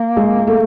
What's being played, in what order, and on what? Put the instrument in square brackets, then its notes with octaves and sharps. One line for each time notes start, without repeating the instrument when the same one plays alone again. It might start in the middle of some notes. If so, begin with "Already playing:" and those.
Already playing: [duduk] A#3
[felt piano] G#3
A3